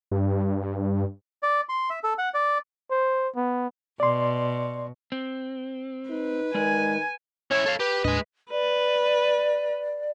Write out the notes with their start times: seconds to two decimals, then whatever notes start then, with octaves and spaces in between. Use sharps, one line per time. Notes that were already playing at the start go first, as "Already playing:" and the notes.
0.12 G2
1.43 D5
1.69 C6
1.90 E5
2.04 A4
2.18 F#5
2.34 D5
2.91 C5
3.36 B3
4.00 B2 D5 C6
5.12 C4
6.10 D#4 B4
6.55 D#3 G#3 D5 G#5
7.51 C#4 E4 C#5
7.66 A4 F5
7.80 G4 B4
8.04 D#2 A2 G#3 D4 D#5
8.51 B4 D5